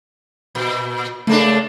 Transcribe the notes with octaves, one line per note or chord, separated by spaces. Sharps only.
A#2
C#3 A3 A#3 D4